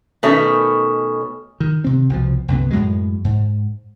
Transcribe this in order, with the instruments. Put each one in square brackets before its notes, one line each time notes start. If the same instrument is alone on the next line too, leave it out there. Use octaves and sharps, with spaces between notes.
[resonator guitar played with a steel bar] B2 D#3 A3 C#4 C#5
[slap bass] D#3
C3 C4
C2 B2 F3
C2 F#2 D3 B3
F#2 A2 F#3 G#3
G#2